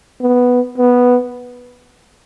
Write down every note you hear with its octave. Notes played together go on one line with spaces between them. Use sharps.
B3
B3